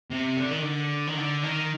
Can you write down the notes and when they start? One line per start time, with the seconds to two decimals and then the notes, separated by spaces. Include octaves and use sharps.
0.11 C3
0.37 D3
0.51 D#3
0.62 D3
1.07 D#3
1.17 D3
1.43 D#3